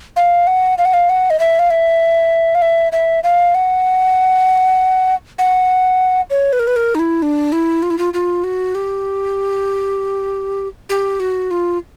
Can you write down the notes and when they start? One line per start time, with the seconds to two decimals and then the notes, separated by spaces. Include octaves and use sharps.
0.16 F5
0.47 F#5
0.78 F5
0.85 F#5
0.93 F5
1.09 F#5
1.30 D#5
1.40 E5
1.59 F5
1.70 E5
2.55 F5
2.62 E5
2.92 E5
3.23 F5
3.55 F#5
5.38 F#5
6.30 C#5
6.53 B4
6.59 A#4
6.67 B4
6.76 A#4
6.95 D#4
6.99 E4
7.22 D4
7.52 E4
7.82 F4
7.90 E4
7.98 F4
8.14 F4
8.44 F#4
8.75 G4
10.89 G4
11.20 F#4
11.51 F4